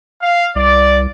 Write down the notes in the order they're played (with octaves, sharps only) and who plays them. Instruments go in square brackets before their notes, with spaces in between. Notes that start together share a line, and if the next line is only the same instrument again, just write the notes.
[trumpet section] F5
[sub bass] C2 [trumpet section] D5